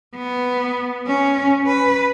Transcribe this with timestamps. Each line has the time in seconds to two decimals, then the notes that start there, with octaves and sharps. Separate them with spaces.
0.15 B3
1.07 C#4
1.67 B4